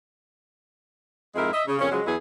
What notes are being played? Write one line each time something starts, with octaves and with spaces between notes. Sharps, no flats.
F2 G#2 G#3 E4 A#4 E5
D#5 E5
C#3
F2 A#2 C#3 C#4
C#3 F3 F#3 G#3
E2 E3 F#3 E4 G#4